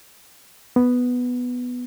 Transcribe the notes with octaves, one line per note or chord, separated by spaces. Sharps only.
B3